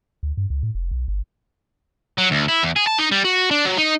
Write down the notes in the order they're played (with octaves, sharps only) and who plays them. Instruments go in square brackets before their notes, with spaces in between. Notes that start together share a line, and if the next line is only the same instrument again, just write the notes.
[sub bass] D2
G2
C#2
A2
F1
B1
G1
[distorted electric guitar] F#3
D2
E4
E2
G#4
A5
D#4
G3
F#4
D4
F#3
D#4